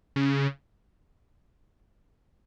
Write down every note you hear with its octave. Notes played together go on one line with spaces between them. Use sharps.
C#3